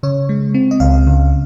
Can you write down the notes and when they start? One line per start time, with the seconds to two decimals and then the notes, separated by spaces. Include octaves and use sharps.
0.03 C#3 C#5
0.29 G#3
0.54 C4
0.71 D#5
0.80 C#2 F5
1.07 C#3